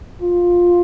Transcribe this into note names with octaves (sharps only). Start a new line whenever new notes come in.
F4